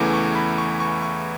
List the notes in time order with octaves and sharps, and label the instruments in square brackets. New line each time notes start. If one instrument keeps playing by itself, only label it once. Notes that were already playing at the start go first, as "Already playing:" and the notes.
Already playing: [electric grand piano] E2 C#3 E3 A3 D6
C#6
B5
C#6
C#6
C#6